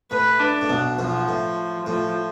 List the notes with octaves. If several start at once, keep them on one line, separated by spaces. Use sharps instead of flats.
A2 B4
D4
A2
B1 B2
B1 B2 F3
A2
A2 F3